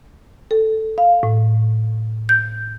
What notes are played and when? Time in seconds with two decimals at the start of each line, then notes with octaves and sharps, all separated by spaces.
0.51 A4
0.98 F5
1.23 A2
2.29 G6